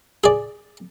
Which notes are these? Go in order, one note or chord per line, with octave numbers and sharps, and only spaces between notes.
G#4 D5